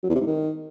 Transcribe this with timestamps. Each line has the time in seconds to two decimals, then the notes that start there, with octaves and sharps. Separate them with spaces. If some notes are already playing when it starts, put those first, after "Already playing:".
0.03 F#3
0.09 E2
0.15 C3
0.21 G#2
0.27 D#3